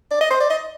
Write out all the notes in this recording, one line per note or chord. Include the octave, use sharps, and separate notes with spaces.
D5
D#5
C5
D5
D#5